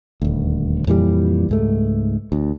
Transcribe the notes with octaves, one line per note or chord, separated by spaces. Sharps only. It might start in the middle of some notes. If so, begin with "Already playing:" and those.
D#1 D2
F2 A#2 E3 G3
C#2 G#2 A3
D2